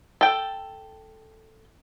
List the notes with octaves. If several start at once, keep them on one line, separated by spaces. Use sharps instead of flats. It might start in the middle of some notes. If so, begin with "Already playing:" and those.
A4 G5